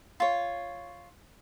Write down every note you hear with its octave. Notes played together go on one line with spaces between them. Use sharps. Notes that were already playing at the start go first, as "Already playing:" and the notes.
F4 C#5